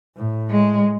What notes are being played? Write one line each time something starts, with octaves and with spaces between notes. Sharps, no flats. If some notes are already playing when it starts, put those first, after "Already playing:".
A2
G#3